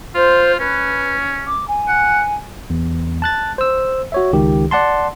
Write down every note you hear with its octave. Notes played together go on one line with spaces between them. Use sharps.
F4 C5
C#4 B4
D6
G#5
F#5
E2
A5 F#6 A6
C5 E6
F#4 C#5 E5
C#2 D#3 G4
D5 F#5 A5 C6